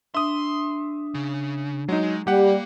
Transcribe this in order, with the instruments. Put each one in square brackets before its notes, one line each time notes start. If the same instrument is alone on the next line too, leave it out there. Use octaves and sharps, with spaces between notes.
[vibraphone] D4 [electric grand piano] E5 D#6 [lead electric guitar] C6
[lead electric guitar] C#3
[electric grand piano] F#3 D#4 [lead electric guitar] G#3
[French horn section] G3 [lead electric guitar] A#3 [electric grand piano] G4 F#5